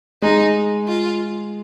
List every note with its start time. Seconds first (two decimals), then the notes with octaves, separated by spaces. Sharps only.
0.22 G#3 D#4
0.88 F4